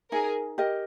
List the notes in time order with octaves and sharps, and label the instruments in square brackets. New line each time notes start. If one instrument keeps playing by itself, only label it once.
[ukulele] D#4 [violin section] G#4 A#4
[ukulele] G4 A#4 D#5